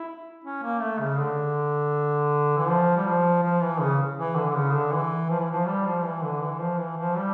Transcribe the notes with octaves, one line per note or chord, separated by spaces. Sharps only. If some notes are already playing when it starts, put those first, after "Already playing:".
Already playing: E4
C#4
A#3
A3
C#3
D3
E3
F3
G3
F3
F3
E3
C#3
E3
D3
D3
C#3
D3
E3
F3
E3
F3
G3
F3
E3
D3
E3
F3
E3
F3
G3